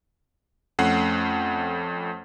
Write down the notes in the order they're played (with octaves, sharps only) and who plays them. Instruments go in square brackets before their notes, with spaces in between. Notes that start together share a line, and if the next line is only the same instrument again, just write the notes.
[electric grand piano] F2 A3 C#4 F#5 C7